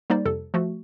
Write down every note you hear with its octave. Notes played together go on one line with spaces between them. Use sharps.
G3 A#3 D#4 C5 D5
F2 C3 A4
F3 A3 F#4